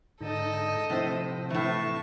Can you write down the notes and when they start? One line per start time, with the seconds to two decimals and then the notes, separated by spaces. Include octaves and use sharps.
0.21 G#2 D3 D#4 A4 D#5
0.90 A2 C3 F3 C4 C5
1.51 A2 E3 A5 C#6